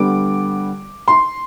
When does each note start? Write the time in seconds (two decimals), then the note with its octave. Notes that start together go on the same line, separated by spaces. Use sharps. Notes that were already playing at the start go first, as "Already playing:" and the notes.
Already playing: D3 G3 B3 D6
1.08 C6